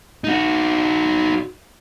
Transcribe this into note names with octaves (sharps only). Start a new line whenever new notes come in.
D#4 F#4